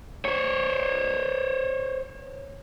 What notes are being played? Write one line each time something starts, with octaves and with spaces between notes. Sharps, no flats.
C5 C#5